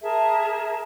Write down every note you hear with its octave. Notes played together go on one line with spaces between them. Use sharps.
G#4 A#4 E5 A5